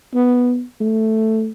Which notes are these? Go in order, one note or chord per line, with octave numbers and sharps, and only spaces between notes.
B3
A3